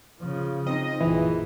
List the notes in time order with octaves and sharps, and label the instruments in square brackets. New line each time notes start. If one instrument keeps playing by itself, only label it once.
[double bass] C#3 F3
[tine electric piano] C4 D#4 [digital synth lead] D#5
[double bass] A#1 F#2 [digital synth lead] E3 [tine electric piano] E4 F4 G#4